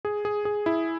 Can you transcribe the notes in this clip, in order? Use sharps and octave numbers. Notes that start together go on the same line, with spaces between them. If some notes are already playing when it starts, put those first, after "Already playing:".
G#4
G#4
G#4
E4